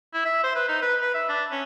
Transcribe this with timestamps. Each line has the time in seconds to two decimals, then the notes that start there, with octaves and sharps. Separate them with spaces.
0.14 E4
0.25 E5
0.44 C5
0.56 B4
0.69 D#4
0.82 B4
1.02 B4
1.14 E5
1.29 D4
1.52 C#4